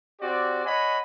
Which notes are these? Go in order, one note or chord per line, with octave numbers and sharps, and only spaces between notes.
C4 F#4 G4 D5
C#5 D#5 F#5 G#5 B5